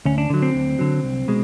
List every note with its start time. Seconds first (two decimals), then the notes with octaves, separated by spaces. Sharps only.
0.05 D2 C#4
0.18 D4
0.30 D3 F#3
0.42 C4
0.55 D2
0.79 D3 F#3
1.03 C2
1.28 B2 G#3